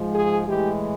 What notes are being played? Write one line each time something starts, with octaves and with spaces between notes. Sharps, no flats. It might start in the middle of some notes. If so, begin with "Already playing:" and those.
Already playing: G#2 F3 G#3
G#4
A2 E3 G#3 G4